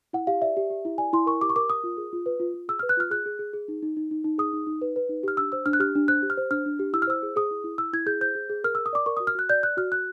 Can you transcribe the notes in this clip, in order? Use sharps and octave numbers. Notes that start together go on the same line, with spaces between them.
E4 F#5
G4 F5
D5 E5
G4
G4
E4
D5 G#5
E4 C6
A#4 C#6
G4 D6
C#6
A#4 D6
A#4 D#6
F4
G#4
F4
B4
F4
F4
G#4 E6
B4 F6
F#6
F4 F6
G#4 F#6
G#4
G#4
G#4
D#4
D#4
D#4
D#4
D#4
G#4 D#6
D#4
D#4
B4
B4
D#4
G4 F6
D4 E6
C5 E6
D4 F6
F#6
G4 F6
D4
C5 F#6
G4
F6
C5
D4 F6
D4
G4
E4 E6
F6
C5 E6
G#4
G#4 D#6
E4
E4
E4 E6
E4 G#6
G#4 G6
C5 G6
G#4
G#4
A#4 F6
A#4 E6
D#6
D5 D6
A#4 C#6
F#4 D#6
F6
F#4 F#6
D5 G6
D5 F#6
F#4 F6
F#4 F#6